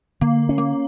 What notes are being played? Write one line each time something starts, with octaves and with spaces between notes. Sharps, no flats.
D3 A#3
C#4
A#3